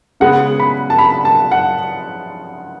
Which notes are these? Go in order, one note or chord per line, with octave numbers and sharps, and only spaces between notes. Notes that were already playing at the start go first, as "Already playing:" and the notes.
C#3 G#3 B3 F#5
B5
A5
B5
A5
F#5